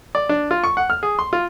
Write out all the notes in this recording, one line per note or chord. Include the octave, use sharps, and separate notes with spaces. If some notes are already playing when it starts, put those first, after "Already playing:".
D5
D4
F4
C#6
F#5
F6
G#4
C6
F4